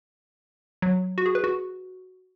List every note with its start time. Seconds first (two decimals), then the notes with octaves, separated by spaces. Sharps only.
0.82 F#3
1.18 F#4
1.26 G#4
1.35 B4
1.44 F#4